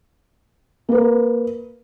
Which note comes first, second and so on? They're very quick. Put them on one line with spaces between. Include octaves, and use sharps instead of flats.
A#3 B4 A#4